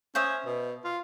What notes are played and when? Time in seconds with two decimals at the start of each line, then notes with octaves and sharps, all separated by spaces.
0.15 C#4 C5 E5 D#6
0.46 B2
0.84 F4